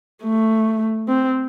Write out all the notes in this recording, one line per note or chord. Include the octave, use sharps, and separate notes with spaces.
A3
C4